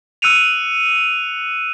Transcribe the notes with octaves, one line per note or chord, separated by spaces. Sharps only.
E6 F#6 C#7 D#7 F7